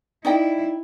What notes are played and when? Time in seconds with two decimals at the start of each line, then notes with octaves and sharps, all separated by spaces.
0.25 D#4 E4 D5 G5